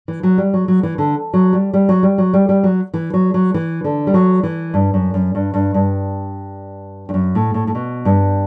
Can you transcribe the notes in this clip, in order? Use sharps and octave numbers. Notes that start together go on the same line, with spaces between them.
E3
F#3
G3
F#3
F#3
E3
D3
F#3
G3
G3
F#3
G3
F#3
G3
G3
F#3
E3
F#3
F#3
E3
D3
G3
F#3
E3
G2
F#2
F#2
G2
G2
G2
G2
F#2
A2
A2
A2
B2
G2